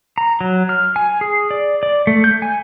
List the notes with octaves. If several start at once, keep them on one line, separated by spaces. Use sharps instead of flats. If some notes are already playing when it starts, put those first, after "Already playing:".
A#5
F#3
F6
G#5
G#4
D5
D5
A3
G6
G#5